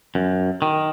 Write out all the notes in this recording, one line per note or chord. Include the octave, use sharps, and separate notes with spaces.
F#2
D#3